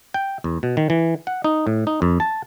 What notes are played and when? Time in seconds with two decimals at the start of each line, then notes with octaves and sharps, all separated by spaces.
0.14 G5
0.44 E2
0.63 B2
0.77 D#3
0.90 E3
1.27 F#5
1.44 D#4
1.67 A2
1.87 D#4
2.02 F2
2.20 A5